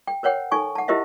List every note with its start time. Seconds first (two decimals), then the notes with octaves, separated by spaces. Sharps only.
0.07 G5
0.23 A#4 C5 C#5 F#5 G5
0.52 D#4 A4 G#5 C#6
0.75 F#5 A5
0.88 E4 G4 A#4 C5 D#5 E5